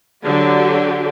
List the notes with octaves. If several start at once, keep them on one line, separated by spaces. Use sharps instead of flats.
D3 F#3 G4